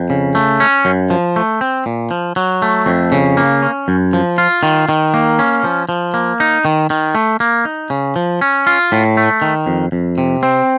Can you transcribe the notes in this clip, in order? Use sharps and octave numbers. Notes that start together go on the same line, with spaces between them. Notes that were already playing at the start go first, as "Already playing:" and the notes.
Already playing: F2
C#3
A3
C#4
F#2
F3
A3
C4
A#2
F3
F#3
A3
F2
C#3
A#3
C#4
F#2
F3
F4
D#3
D#3
A#3
C#4
F3
F3
A#3
D#4
D#3
D#3
A3
A#3
D#4
C#3
F3
C#4
F4
A2
A3
D#3
F2
F2
C3
C4